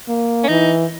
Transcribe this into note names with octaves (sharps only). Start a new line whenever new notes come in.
A#3
C#4
E3 D#4